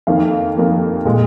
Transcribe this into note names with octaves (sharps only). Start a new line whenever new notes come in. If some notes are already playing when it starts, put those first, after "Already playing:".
F2 D#3 A#3 F5
F2 D#3 A#3
A#2 G#3